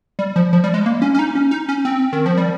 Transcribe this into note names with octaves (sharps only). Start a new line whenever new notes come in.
G3
F3
F3
G3
G#3
A#3
C#4
C#4
D#4
C#4
D#4
C#4
C4
D#3
F3
G3